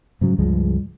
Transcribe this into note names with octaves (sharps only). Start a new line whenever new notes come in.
G#2 C#3 F#3
C#2 G2 F3 G#3